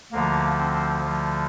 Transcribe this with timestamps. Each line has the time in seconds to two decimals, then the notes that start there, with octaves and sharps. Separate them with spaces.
0.12 D2 D3 F3 A#3
0.59 C4
1.05 F3